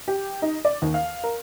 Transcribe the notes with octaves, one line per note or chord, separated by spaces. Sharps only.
G4
D#4
D5
D#2
F5
A#4